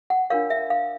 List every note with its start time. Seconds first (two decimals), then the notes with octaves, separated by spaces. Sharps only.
0.10 F#5
0.30 D4 F4 A#4 C#5 F5
0.50 E5
0.70 F5